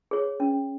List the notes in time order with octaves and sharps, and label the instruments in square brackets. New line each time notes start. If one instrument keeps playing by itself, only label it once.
[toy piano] G#4 C#5
C#4